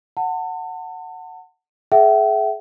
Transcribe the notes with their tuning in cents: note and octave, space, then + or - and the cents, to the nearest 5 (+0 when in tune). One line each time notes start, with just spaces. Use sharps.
F#5 +0 A5 +35
G#4 +35 E5 +5 G5 -45